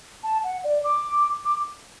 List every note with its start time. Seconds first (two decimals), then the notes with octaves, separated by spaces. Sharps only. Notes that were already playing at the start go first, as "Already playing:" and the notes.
0.24 A5
0.44 F#5
0.64 D5
0.84 D6
1.45 D6